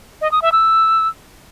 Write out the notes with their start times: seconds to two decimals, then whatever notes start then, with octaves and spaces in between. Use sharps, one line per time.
0.21 D#5
0.32 D#6
0.42 E5
0.52 E6